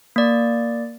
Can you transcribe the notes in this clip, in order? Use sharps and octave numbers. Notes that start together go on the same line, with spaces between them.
A#3 D5